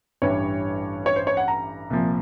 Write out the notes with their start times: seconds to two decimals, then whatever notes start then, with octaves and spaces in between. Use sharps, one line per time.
0.22 A1 G2 E3 G3 C#5
1.06 C#5
1.16 C5
1.27 C#5
1.37 F#5
1.48 A#5
1.90 C2 A#2 F3